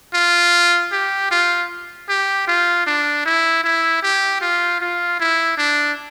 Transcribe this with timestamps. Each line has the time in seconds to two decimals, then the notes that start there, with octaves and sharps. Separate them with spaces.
0.14 F4
0.92 G4
1.31 F4
2.09 G4
2.48 F4
2.87 D4
3.26 E4
3.64 E4
4.03 G4
4.42 F4
4.81 F4
5.20 E4
5.58 D4